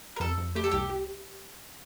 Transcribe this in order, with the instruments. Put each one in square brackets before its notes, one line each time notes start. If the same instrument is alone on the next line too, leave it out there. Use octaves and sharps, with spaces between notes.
[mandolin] A#4
[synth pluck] F2 [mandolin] A4
[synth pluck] F2
[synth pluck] A3 [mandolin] G4
[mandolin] A4
[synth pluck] C2 [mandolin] G4
[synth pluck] G4